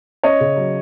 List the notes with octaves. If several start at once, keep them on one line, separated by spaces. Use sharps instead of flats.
C#4 C#5 D#5
C#3
F#3